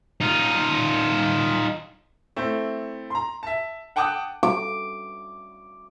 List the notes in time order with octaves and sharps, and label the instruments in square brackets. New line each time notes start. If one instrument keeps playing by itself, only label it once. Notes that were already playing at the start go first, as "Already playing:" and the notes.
[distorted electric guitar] D#4 F4
[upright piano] A3 C4 E4
A#5 C6
E5 A5
F#5 G5 A5 D6 D#6 F#6
[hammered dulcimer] D6